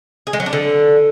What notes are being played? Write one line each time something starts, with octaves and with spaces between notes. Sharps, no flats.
G#4
G#3
F#3
D4
D3